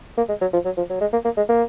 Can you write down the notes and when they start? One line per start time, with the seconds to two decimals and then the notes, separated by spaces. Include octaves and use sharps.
0.18 A#3
0.29 G#3
0.41 F#3
0.53 F3
0.65 F#3
0.77 F3
0.90 F#3
1.01 G#3
1.13 A#3
1.25 A#3
1.37 G#3
1.49 A#3